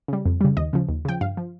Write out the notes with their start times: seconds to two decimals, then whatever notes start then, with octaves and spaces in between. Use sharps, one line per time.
0.08 C#3 G3
0.26 F2
0.41 C#3 G3
0.57 D#2 D#5
0.73 C#3 F3
0.89 D#2
1.05 C#3 F3 G5
1.21 G2 F5
1.37 F3